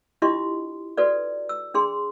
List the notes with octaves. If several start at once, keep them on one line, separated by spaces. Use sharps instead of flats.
D4 E4 F4 G4 D#5 C6
F#4 A4 B4 D5
E6
D4 G#4 C6